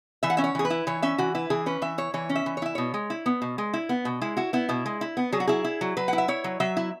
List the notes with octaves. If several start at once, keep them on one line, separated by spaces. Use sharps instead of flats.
E3 E5
F#5
C#4 E5
C#5
E3 G#4
B4
E4
E3 C#5
C#4 E5
E3 F#4
E4 B4
E3 G#4
C#4 B4
E3 E5
E4 C#5
E3 C#5
C#4
E5
E3
C#5
E4 E5
B2 C#5
G#3
E4
B3
B2
G#3
E4
B3
B2
G#3 E4
E4 F#4
B3 E4
B2 E4
G#3
E4
B3
F#3 G#4
F#4
E4 G#4
E4
F#3
F#3 B4
F#5
E4
E5
E4 C#5
F#3
F#3 E5
E4